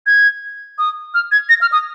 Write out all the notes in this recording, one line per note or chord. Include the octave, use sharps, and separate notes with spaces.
G#6
D#6
F6
G#6
A#6
F6
D#6